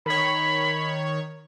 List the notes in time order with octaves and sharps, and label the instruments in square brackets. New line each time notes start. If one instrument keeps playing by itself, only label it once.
[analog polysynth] D#3 C#5 [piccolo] B5